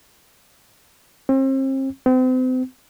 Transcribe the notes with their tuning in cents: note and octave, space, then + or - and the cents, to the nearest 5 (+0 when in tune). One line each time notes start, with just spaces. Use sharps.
C4 +40
C4 -35